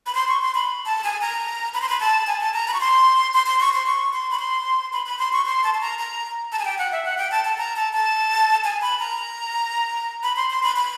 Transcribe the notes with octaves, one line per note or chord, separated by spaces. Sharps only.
B5
C6
C#6
C6
B5
A5
G#5
A#5
B5
C6
B5
A5
G#5
A5
A#5
B5
C#6
C6
C6
C6
C#6
C6
C#6
C6
B5
C6
B5
B5
C6
C#6
C6
A5
A5
A#5
A#5
A5
G#5
G5
F#5
E5
F#5
G5
A5
A5
A#5
A5
A5
G#5
B5
A#5
B5
C6
C6
B5
B5